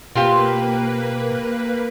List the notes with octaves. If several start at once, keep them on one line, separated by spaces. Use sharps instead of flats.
B2 A#3 C4 F4 G4 B4